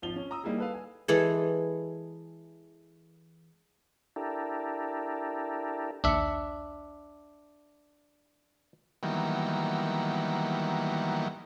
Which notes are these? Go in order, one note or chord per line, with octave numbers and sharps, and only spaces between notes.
G#1 F3 F4 F7 G7
C#4
A#5 D#6 E6
G3 A#3 D#4 E4 G#4
A4 B4 F5
G#5
E3 G#3 G#4 A4
D4 E4 G4 A4 A#4
A#1 D#2 D4 E5 C#7
D#3 E3 F#3 G3 A#3 B3